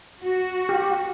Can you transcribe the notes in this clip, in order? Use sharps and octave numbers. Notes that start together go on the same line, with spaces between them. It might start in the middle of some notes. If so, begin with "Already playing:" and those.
F#4
G4